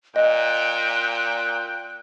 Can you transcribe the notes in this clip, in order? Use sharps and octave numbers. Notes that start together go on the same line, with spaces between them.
A#2 D#5 G5 F#6